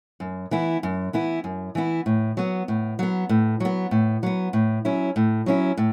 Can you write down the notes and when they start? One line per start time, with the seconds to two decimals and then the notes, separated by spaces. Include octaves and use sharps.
0.20 F#2
0.51 E3 B3 E4
0.83 F#2
1.13 E3 B3 E4
1.44 F#2
1.75 E3 B3 E4
2.06 A2
2.37 F#3 B3
2.68 A2
2.99 F#3 B3
3.29 A2
3.60 F#3 B3
3.91 A2
4.23 F#3 B3
4.53 A2
4.85 F#3 C#4 E4
5.16 A2
5.46 F#3 C#4 E4
5.77 A2